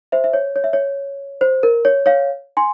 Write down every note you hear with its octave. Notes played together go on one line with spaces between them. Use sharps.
C5 E5
E5
C#5
C#5
E5
C#5
C5
A#4
C#5
C#5 F5
G#5 C6